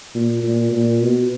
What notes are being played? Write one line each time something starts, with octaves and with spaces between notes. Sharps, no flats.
A#2
A#2
A#2
B2